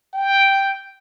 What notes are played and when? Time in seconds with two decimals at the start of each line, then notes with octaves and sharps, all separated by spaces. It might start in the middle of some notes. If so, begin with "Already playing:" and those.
0.14 G5